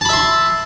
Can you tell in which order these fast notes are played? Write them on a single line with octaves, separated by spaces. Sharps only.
A5 B5 E5 C6